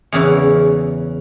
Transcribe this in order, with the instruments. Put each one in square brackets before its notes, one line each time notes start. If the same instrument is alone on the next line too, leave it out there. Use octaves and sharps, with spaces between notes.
[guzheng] E2 C#3 E3